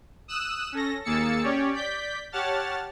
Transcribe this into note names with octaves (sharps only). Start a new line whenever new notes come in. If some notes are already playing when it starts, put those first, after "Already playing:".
D#6 E6 F#6 E7
C#4 A4 A#6
D#2 A#3 G#4 E6 A6 C#7
C#4 G4 C#5 D5
D5 G6 B6
G4 C#5 F#5 A5 F6 A6